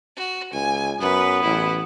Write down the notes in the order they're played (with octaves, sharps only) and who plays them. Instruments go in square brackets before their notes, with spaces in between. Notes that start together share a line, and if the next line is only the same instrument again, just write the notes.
[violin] F#4
[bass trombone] C#2 [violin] G#5
[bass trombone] F#2 [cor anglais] B3 [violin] B4
[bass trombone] A1 [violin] E4